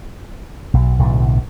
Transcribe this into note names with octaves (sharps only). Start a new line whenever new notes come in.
B1
B1 A2 D3